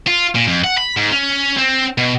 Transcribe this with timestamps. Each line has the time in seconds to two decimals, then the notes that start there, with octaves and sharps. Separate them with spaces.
0.07 F4
0.35 A#2
0.47 F2
0.64 F#5
0.78 B5
0.97 G#2
1.12 C#4
1.59 C4
1.98 B2